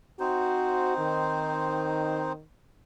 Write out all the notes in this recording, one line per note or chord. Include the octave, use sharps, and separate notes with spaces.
C4 D#4 F#4 C5
D#3